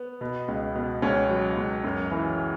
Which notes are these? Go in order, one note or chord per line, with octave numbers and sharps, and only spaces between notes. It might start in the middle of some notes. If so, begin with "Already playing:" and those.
Already playing: B3
B2
C#2
B2
C#2 C#4
F#3
C#2
F#2
E3